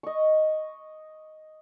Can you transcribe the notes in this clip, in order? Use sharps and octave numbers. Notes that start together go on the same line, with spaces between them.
D#5 C#6